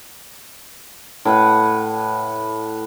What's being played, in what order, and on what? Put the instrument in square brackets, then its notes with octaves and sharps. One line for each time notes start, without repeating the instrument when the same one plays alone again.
[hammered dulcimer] A2 B4 F#5